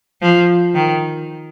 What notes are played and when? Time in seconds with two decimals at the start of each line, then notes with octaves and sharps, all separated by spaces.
0.21 F3
0.75 D#3